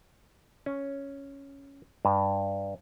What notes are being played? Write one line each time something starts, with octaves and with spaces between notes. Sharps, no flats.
C#4
G2